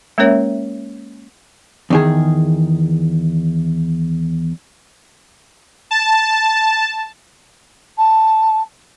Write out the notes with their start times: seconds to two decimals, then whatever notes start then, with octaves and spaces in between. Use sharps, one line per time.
0.18 G#3 A#3 C#4 A#4 C#5 E5
1.90 E2 D#3 G#4
5.91 A5
7.97 A5